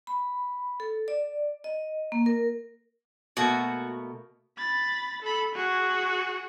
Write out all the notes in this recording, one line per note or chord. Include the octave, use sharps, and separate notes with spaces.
B5
A4
D5
D#5
A#3
A#4
B2 A3 A#3 F#4
B5 A6
A4 B5
F#4 G#4